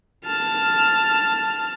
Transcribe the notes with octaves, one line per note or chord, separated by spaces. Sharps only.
A5 F6